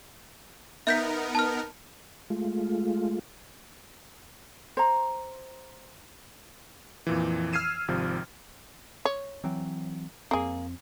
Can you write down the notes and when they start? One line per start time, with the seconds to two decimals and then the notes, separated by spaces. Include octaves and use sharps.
0.87 B3 D#4 A#4 E5 G6 B6
1.35 A5 F6
2.30 G#3 A3 F4
4.77 C5 A#5
7.07 F2 A#2 E3
7.53 E6 F6 G#6 C7 D#7 E7
7.88 G#1 C3 F3
9.05 C#5
9.44 E3 F#3 C4
10.31 F2 A#3 C4 G#4